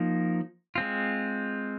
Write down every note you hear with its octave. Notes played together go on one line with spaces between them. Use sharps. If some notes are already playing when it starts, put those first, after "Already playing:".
Already playing: F3 A#3 D#4
G#3 C4 F4